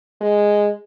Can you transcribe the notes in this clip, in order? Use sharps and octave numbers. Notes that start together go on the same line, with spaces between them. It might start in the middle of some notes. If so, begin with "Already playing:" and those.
G#3